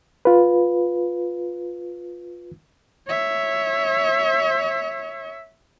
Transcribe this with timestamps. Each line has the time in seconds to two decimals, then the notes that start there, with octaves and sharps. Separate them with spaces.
0.25 F4 B4
3.08 C#5 E5